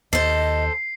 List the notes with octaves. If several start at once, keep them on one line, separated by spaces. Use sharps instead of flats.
D#2 A4 C5 D#5 C7